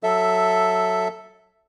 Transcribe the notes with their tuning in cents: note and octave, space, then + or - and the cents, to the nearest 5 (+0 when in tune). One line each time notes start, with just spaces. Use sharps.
F#3 +0 A4 +5 E5 +0